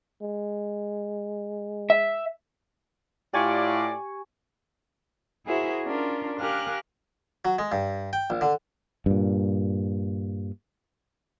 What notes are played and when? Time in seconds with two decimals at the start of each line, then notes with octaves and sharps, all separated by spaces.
0.22 G#3
1.90 E5
3.34 A2 F4 G4 D5 G#5 C#6
5.46 E4 F#4 G#4 A#4 C5 E5
5.84 C#4 D4 F4 A#4
6.39 G4 A#4 F5 G#5 F6 F#6
7.45 F#3
7.59 G#3
7.72 G2
8.13 G5
8.30 A#1
8.41 D3
9.06 G2 A#2